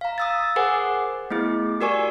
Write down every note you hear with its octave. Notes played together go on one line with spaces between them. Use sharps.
F5 A#5
D#6 E6 A6
G#4 A#4 C5 F#5 G#5
A3 B3 E4 G#4
F#4 G4 A#4 D5 G#5 C#6